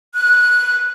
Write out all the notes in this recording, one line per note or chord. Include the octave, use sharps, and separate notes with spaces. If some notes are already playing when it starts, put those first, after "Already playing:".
F#6